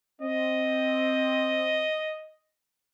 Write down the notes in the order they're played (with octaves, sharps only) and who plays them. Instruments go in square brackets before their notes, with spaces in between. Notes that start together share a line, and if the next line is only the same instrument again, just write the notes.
[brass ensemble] C4 [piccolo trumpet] D#5